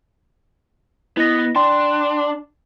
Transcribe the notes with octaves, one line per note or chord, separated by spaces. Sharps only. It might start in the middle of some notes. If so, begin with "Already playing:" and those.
B3 E4 D#5 A#6
D4 G5 C6